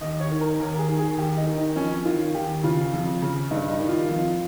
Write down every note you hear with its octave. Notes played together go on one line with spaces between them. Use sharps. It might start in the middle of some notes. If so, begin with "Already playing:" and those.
D#2 D#5
C#5
D#3
A#4
D#2 A#4
G#4
D#3
G#4
D#2 G4
D#4
D#3
D#4
F2 C#4
D#3 F4
D#2 G4
C#3 F4
F2
C#3
G2 D#4
D#4
D#3
F4
F2